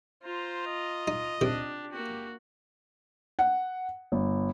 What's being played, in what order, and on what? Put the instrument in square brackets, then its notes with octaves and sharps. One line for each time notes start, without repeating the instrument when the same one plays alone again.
[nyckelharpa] F4 A#5 [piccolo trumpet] C5
[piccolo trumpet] D#5
[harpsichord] D#4
[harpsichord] C3 D#3 [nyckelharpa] D4 G4
[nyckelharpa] A#3 F#4 [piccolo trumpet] G4
[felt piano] F#5
G1